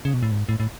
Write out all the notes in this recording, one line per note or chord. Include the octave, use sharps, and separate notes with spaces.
C#3
B2
A2
G#2
A2
A2